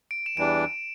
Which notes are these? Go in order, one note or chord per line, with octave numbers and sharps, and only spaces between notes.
D7
E7
E2 E3 G3 D4 D7